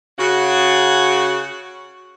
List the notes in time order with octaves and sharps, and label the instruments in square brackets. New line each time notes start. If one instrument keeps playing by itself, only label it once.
[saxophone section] C#3 F#4